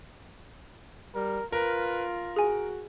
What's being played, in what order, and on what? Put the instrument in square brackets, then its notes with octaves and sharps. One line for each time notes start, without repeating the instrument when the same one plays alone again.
[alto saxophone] G3 [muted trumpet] A#4
[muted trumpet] F4 [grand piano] A#4 [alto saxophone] B4
[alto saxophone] F#4 [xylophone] G#4 G#5